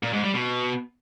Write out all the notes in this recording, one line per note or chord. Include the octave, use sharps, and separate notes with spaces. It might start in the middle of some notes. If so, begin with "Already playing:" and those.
A#2
G#2
G3
B2